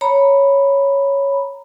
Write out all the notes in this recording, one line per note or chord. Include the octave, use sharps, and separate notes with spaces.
C#5 A#5 B5